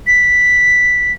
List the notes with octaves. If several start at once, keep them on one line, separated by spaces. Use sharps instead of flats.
B6